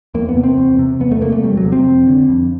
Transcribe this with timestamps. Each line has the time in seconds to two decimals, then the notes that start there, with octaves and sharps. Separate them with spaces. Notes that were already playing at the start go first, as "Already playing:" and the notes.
0.14 E2 A#3
0.29 B3
0.36 C3
0.43 C4
0.57 E2
0.79 C3
1.00 E2 B3
1.11 A3
1.21 C3 A#3
1.32 A3
1.43 E2 G3
1.57 F#3
1.65 C3
1.72 C4
1.85 F2
2.07 D3
2.29 F2